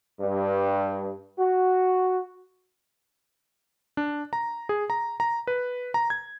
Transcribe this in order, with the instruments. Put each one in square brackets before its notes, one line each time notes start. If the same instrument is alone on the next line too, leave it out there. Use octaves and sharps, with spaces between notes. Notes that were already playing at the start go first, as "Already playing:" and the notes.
[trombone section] G2
F#4
[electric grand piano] D4
A#5
G#4
A#5
A#5
B4
A#5
G#6